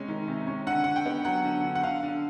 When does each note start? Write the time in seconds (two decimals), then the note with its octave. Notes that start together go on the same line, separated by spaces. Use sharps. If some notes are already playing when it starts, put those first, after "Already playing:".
Already playing: C3 G#3 C#4
0.08 D#3
0.28 C3
0.47 C#4
0.66 D3 F#5
0.84 D3 F#5
0.96 G5
1.06 B3
1.25 F#3 F#5
1.45 D3
1.64 D3
1.75 F#5
1.83 D3 F5
2.03 D3